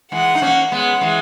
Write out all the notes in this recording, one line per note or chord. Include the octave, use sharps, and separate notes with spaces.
E3 G#3 F#5
D#4
A#3 C#4
G#3 B3 F#5
E3 G#3